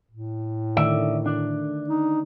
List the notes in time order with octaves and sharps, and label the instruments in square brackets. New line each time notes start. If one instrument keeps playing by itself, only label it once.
[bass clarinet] A2
[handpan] D3 D#3 A3 [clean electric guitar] D5 E5
[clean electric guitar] D4
[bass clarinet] D#4